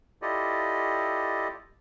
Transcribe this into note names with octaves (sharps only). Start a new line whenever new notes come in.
E4 F4 G4 A4 D5 D#5